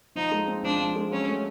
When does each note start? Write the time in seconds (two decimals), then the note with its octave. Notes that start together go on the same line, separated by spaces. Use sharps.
0.15 F3 D#4
0.31 G#3
0.47 C4
0.63 F3 D4
0.79 F3
0.95 G#3
1.11 F#3 C#4
1.27 A3